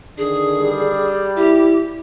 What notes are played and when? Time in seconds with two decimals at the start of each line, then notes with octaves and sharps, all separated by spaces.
0.18 D3 D#3 D4 G#4
0.59 G3
1.37 E4 G4